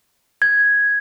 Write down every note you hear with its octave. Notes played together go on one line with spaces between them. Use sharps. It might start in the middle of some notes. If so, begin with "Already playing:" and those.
G#6